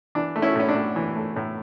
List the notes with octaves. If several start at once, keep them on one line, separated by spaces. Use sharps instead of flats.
E3 D4
A3
C#4 E4
A2 C#4
D4
A2
E3
A3
A2